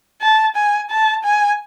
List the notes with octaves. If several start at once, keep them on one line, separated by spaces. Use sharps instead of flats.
A5
G#5
A5
G#5